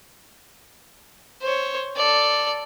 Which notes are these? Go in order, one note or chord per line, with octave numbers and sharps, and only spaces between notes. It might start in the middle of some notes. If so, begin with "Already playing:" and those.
C5 C#5
A4 D5